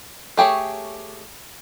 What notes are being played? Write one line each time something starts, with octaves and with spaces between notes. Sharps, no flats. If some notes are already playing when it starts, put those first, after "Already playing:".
A3 G4 G#4 C#5